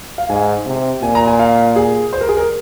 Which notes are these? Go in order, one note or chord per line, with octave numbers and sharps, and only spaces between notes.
F5
G#2 G#5
C3
A#2 G#5
A#5
G#5
F5
G#4
C5
A#4
G#4
A#4